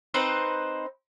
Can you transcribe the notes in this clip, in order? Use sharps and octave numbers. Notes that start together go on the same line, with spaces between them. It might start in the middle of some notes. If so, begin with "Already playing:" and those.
C4 D#4 B4 C5